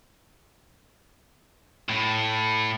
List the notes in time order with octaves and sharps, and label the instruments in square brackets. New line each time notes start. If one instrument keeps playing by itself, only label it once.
[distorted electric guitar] A2